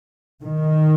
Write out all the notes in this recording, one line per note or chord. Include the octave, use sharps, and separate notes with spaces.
D#3